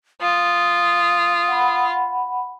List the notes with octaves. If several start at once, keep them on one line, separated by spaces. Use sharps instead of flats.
F4 D#6
F#5 B5